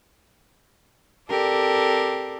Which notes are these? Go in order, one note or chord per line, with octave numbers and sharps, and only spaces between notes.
C4 G4 A4 A#4 D5